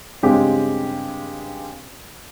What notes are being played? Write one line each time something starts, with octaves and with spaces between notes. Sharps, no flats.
G2 C#3 G#3 C4 G4